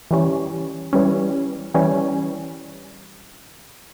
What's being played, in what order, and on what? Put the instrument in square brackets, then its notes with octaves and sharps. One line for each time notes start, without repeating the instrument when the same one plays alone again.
[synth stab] E3 G3 C#4
E3 G3 C#4
E3 G3 C#4